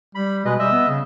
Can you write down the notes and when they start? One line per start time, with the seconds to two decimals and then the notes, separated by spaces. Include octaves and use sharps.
0.15 G3 B5
0.45 B2 G#3 B4 D#5
0.59 G3 D#5 E5
0.71 B3
0.88 C#3